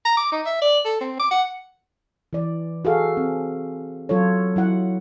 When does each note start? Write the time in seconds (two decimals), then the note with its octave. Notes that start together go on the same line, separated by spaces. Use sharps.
0.05 A#5
0.17 D6
0.32 D#4
0.46 E5
0.62 D5
0.85 A4
1.01 C4
1.20 D6
1.31 F#5
2.33 E3 D5
2.85 F#4 G#4 A4 F5
3.17 C4
4.09 F#3 F4 A4 C#5
4.56 F#3 E4 F#5